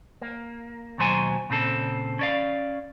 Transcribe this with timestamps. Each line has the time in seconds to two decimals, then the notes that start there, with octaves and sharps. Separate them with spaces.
0.22 A#3
0.98 D#2 B2 F#3 C5 G#5
1.50 A#2 C#3 C4 A4
2.19 C#4 D5 F5